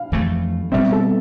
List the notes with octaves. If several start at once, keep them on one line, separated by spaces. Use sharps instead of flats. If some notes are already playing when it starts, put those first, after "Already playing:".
Already playing: F5
F2 E3 A3
B2 G3 C4 E5
A4